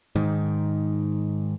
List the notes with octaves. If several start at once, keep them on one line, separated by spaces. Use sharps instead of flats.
G#2 D#3